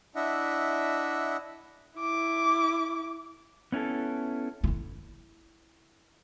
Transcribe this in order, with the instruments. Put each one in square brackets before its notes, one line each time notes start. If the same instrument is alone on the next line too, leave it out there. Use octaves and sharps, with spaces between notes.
[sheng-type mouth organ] D4 E4 D#5 E5 F#5
[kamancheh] E4 D6
[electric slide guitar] B3 C#4 E4 A4
[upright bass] E4 F4